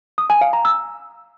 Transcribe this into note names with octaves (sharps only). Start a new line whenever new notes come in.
D#6
G#5
F5
A#5
E6